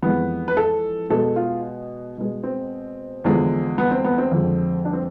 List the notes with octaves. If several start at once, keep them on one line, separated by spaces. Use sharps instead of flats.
F2 E3 G#3 B3
B4
A4
B2 G#3 A4
F4
B2 G#3
C4
E2 D3 F3 G#3
B3
C4
B3
C4
F2 D3 F3 G#3
D4
C4